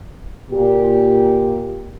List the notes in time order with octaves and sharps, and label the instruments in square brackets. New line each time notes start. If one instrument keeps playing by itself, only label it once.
[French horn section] A#2 G4